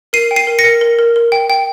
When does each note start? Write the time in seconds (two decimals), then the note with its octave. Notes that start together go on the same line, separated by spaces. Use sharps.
0.13 A#4 C7 D#7
0.31 G5
0.36 C7 D#7
0.47 A#4
0.59 A#6 C#7
0.64 A#4
0.81 A#4
0.99 A#4
1.16 A#4
1.32 G5
1.50 G5